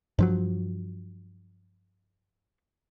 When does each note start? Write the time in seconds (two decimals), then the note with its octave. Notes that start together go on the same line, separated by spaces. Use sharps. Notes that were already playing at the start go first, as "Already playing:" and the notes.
0.19 G2 F3 F#3